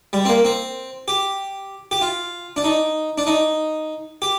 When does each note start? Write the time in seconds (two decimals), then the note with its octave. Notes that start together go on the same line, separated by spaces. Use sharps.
0.13 G3
0.25 C4
0.29 A#3
0.45 C4
1.08 G4
1.91 G4
2.01 F4
2.56 D4
2.64 D#4
3.18 D4
3.27 D#4
4.22 G4